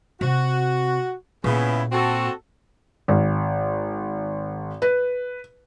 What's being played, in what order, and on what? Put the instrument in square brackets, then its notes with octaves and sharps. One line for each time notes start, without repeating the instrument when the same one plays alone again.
[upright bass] C3 [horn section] F#4
[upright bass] A#2 [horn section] C#3 B3 E4
[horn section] C4 F#4 A4
[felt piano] G#1
B4